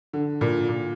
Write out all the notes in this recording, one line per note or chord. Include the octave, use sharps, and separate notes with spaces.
D3
A#2
A#2